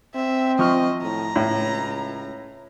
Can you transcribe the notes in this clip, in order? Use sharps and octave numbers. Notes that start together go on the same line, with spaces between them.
C4 E5
F3 D#5 C#6 F6
A2 A#5
C#2 A2